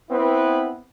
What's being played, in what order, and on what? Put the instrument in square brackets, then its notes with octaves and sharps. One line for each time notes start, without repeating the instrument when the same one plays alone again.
[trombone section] B3 C4 E4 B4